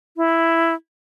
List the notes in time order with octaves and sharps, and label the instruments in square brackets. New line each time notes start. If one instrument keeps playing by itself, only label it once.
[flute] E4